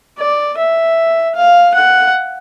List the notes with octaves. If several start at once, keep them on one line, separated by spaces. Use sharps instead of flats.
D5
E5
F5
F#5